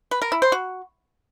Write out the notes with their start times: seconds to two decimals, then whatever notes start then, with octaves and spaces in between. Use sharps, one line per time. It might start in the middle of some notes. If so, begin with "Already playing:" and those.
0.11 B4
0.22 A#4
0.32 E4
0.42 C5
0.52 F#4